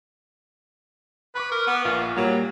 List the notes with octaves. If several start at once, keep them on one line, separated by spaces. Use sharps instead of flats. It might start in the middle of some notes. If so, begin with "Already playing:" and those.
B4 B5 C#6 D6
A#4
B3
A#1 A#2 F4 C#6
A#2 F#3 G3 A#3